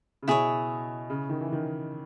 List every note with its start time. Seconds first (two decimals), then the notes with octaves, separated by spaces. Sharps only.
0.23 C#3
0.28 B2 E4 G#4 C#5
1.10 C#3
1.29 D#3
1.41 E3
1.52 D#3